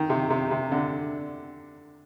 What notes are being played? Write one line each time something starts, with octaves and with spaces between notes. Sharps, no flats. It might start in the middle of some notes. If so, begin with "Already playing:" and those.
Already playing: D#3
C3
C3
C3
D3